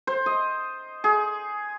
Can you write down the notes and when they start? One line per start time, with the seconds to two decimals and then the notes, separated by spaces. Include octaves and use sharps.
0.07 C5
0.26 D#5
1.04 G#4